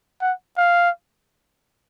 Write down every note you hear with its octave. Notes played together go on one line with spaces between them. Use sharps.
F#5
F5